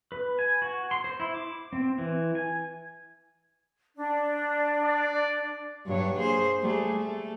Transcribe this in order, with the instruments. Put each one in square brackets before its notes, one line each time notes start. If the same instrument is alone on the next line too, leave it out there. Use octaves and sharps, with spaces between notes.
[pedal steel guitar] B4
G#5
F#4
C6
C5
E4
D6
C4
E3
G#5
[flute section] D4
[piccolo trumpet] D5
[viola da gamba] G2 F#3 C#5
A#3 G#4 C5
G3 A3 G#4
A3